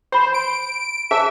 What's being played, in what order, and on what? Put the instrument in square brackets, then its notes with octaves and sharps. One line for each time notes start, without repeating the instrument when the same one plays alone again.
[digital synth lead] C5 [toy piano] B5 C6
[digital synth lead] D7
[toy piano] G#4 C5 A5 [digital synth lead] E5